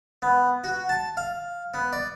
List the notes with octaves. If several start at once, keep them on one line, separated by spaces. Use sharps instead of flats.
B3
F#4
A5
F5
B3
D5